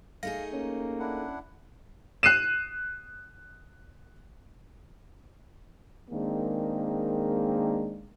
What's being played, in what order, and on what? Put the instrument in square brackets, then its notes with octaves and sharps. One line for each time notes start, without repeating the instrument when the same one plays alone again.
[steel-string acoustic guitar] A3 D#4 G#4 [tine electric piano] F5 A#6
[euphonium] A#3 [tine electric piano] C#4
[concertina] D4 E4 F#5
[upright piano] F#6 C7 D#7 E7
[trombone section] D#3 G#3 A#3 C4 D4 G#4